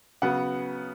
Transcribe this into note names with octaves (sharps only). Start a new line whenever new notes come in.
C#3 F#3 B3 F#5